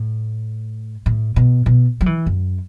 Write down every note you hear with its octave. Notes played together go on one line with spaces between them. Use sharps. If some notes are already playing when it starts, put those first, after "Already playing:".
Already playing: A2
A2
B2
B2
F#3
E3
F#2